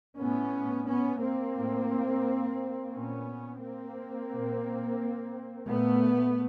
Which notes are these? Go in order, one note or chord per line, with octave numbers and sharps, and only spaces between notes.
A2 B3 C#4
B3 C#4
A#3 C4
A2
A#2 B3 C#4
A#3 C4
A#2
A#2 A3 B3